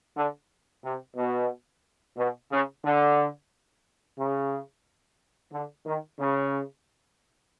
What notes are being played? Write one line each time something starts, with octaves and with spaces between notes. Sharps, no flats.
D3
C3
B2
B2
C#3
D3
C#3
D3
D#3
C#3